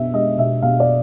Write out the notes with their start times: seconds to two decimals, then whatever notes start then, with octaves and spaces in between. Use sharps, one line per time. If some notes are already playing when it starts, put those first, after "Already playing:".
Already playing: B2 B3 E5
0.13 G#3 D#5
0.38 B2 E5
0.62 B2 F5
0.80 D5